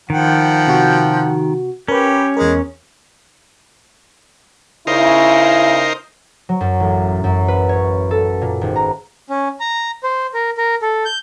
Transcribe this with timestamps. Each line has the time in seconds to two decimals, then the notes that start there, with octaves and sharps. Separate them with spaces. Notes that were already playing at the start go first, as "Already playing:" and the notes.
0.10 D#3 F3 F#5 G5
0.68 C3 F#4
1.88 C#4 G4 A#4 B4
2.37 E2 G#3 A#4
4.87 C#3 D#4 E4 A#4 C5
6.49 F#3
6.61 F#2
6.80 A1
7.24 F#2
7.48 B4
7.69 C#5
8.11 A4
8.41 A#2
8.61 G#1
8.76 A#5
9.28 C#4
9.60 A#5
10.04 C5
10.34 A#4
10.57 A#4
10.82 A4
11.05 G6